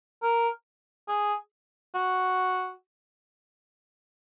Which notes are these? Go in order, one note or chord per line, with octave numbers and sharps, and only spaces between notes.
A#4
G#4
F#4